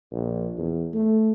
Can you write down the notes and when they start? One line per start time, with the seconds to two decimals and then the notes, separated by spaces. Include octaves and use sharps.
0.12 A#1
0.58 E2
0.94 A3